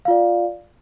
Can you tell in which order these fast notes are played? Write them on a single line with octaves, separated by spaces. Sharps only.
F5 F4 D5